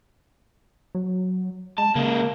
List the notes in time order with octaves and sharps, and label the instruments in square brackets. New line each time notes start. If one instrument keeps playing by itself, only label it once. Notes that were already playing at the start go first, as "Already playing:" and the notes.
[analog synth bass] F#3
[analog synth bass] G#3 [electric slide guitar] A5
[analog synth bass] C#3 [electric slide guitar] G#3 A#3